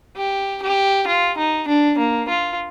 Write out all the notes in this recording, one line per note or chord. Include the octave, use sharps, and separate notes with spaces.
G4
G4
F4
D#4
D4
A#3
F4